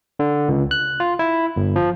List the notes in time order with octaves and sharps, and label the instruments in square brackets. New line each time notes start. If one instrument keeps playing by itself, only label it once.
[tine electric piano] D3
C#2
F#6
F4
E4
G1
F3